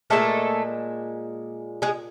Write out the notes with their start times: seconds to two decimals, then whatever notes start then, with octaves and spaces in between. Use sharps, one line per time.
0.10 A#2 F3 G#3 A3 A4
1.82 G#3 G#4